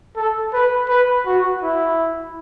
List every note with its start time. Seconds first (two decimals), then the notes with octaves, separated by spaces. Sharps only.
0.16 A4
0.53 B4
0.89 B4
1.26 F#4
1.63 E4